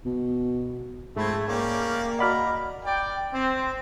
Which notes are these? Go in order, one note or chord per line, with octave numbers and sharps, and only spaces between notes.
B2
G#2 F3 A3 C4 G#4 B5 G#6
A#3 C#4 D5 G5
F6
F#4 A#4 D5 D#5 F#5 B5 F6
D5 G5
C4